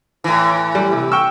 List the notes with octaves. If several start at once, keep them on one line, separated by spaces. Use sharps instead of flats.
A2 E3
G3
C3
G5 C#6 E6